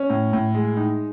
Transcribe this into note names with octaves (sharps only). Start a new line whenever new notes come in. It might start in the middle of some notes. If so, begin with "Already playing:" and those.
Already playing: C#4
A2
A2
G#3
D#4